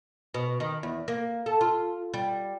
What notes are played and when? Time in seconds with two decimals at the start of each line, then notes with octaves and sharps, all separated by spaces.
0.34 B2
0.60 D#3
0.83 E2
1.08 A#3
1.46 A4
1.61 F4
2.14 G3